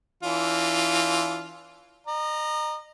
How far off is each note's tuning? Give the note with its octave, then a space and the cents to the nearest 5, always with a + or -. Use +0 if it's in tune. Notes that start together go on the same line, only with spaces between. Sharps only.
E3 +0 D4 -45 F4 +0
D#5 -35 A#5 +0